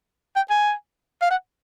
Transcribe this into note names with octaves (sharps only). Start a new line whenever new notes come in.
G5
G#5
F5
F#5